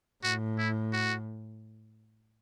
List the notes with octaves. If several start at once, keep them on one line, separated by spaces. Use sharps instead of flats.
A2 F#4
E4
F#4